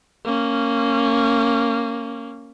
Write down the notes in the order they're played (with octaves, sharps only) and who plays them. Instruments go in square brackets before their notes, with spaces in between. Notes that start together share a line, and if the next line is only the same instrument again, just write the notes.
[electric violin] A#3 C#4